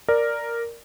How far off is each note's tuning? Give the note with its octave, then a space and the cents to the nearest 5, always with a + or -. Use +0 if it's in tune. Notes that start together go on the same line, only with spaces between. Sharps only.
A#4 +0 D5 +0